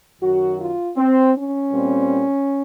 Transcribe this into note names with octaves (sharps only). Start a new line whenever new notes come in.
F#2 D#3 F#3 F#4
F4
C4
C#4
A#2 G3 C4